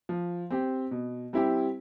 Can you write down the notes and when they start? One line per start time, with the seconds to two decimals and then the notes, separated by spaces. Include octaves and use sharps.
0.09 F3
0.50 C4 G4
0.91 B2
1.33 G3 C4 E4 G4